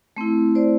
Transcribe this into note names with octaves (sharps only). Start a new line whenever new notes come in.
A3 C4 E4
C5 D5